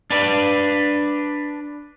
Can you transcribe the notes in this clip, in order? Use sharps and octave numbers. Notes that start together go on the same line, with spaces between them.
D4 B4 D5